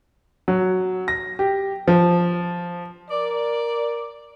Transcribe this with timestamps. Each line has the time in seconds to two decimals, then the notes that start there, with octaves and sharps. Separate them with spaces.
0.48 F#3
1.08 A#6
1.39 G4
1.88 F3
3.11 A#4 D5